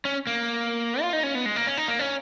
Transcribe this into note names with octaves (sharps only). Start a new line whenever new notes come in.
C#4
A#3
F4
D#4
C#4
B3
G#3
A#3
C#4
D#4
A#3
C#4